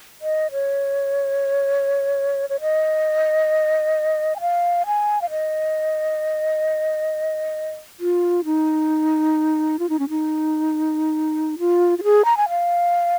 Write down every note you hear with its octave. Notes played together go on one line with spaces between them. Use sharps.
D#5
C#5
C#5
D#5
G#5
F5
G#5
F5
D#5
F4
D#4
F4
D#4
C#4
D#4
F4
F4
G#4
A#5
G#5
F5